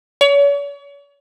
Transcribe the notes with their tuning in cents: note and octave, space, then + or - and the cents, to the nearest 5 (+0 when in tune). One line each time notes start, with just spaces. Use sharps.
C#5 +40